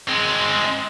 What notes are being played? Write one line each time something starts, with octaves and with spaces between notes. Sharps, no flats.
G#3 C4